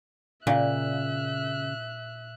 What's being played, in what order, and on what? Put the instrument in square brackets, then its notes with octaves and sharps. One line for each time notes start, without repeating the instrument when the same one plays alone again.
[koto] A#2 [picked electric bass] C#3 [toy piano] D5 F5 [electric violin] E5 F#6